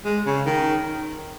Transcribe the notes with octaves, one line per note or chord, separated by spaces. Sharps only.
G#3
C#3
D#3